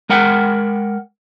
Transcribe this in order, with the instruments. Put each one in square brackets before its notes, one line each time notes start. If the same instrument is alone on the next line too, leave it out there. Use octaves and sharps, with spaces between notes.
[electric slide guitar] G#3 A#4 F#5 G5